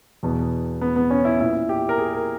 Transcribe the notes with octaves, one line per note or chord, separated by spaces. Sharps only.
E2 B2
B3
B3
C#4
E4
A#2 E4
G4
A#4
G#4
A#4